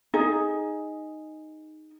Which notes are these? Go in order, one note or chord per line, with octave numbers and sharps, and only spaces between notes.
D#4 G#4